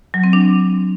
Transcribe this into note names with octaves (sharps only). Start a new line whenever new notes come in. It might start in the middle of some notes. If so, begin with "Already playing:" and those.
F#3
C4
D4